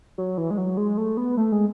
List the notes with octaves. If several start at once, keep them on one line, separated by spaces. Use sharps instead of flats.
F#3
E3
G#3
F#3
G#3
A3
B3
A3
G#3